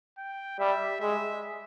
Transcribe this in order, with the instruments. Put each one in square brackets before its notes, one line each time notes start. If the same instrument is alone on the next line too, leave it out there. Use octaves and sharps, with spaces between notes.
[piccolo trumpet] G5
[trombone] G3 [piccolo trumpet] E5
[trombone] G#3 [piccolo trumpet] E5